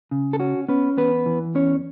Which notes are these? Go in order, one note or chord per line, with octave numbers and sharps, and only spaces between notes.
C#3
A4
C#4 F#4
B3 C#4 B4
E2 B3 B4
E3
E2 C#4 C#5